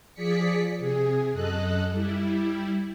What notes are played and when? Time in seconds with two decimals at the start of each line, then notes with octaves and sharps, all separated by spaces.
0.13 F3 G#4 D5 B6 C#7
0.79 C3 G#4
1.32 F#2 A4 D#5 F#6
1.91 G3 E4